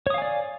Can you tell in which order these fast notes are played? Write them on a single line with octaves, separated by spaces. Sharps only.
C#5 D#6 F5 G#5 D5